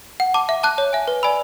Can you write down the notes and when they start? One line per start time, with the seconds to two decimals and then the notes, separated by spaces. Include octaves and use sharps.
0.20 F#5
0.34 A5 D6
0.49 E5
0.63 A5 D6 F#6
0.78 C#5
0.93 E5 G#5
1.08 B4
1.23 D5 G#5 B5 E6